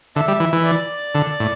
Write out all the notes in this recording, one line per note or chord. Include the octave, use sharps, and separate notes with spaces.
D3 E5
G3
E3
E3
D5
D3
A2